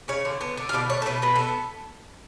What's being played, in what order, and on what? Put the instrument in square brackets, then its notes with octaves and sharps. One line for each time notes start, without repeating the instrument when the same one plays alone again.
[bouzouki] C#3 C#5
D3
B3
D3
F5
B2 D5
A3 C#5
A4
B2 B4
B2 B4
B3 A4